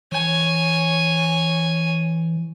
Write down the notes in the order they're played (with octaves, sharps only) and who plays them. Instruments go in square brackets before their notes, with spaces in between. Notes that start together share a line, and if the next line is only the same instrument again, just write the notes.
[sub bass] E3 [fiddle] C#5 G#5